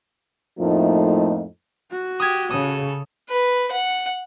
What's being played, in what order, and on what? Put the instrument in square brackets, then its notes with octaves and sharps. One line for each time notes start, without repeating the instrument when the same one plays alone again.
[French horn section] F2 A2 F3 A3 A#3 D#4
[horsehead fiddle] F#4
[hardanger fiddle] G4 [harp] D#6 G#6
[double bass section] C#3 [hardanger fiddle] A4 C#5 [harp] D#6
[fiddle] B4
F#5